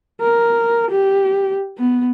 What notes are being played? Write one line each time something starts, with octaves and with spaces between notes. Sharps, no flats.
A#4
G4
B3